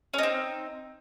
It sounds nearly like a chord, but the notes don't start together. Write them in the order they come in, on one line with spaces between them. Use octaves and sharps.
C#4 D#4 C4